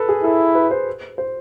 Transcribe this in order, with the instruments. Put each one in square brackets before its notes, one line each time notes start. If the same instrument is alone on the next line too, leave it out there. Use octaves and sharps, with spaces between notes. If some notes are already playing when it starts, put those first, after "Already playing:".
Already playing: [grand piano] A4 B4
G#4
[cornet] E4 [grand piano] A4
[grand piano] B4
C5
C5